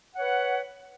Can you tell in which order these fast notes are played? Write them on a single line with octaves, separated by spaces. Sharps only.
F#5 C#5 B4